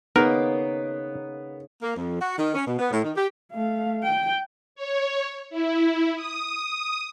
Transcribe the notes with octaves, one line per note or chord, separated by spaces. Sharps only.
C#3 A#3 B3 D#4 A#4
A#3
F2
F#4
D#3
C#4
B2
B3
A2
D#3
G4
A3 F5
G5
C#5
E4
D#6